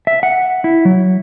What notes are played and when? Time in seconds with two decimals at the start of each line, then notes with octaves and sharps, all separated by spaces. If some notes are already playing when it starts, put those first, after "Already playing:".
0.07 E5
0.23 F#5
0.64 E4
0.85 F#3